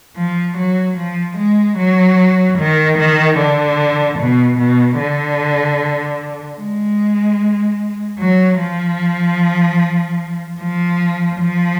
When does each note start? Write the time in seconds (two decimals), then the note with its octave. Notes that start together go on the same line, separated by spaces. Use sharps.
0.17 F3
0.58 F#3
0.98 F3
1.37 G#3
1.78 F#3
2.58 D#3
2.98 D#3
3.38 D3
4.19 B2
4.58 B2
4.99 D3
6.59 G#3
8.19 F#3
8.60 F3
10.60 F3
11.40 F3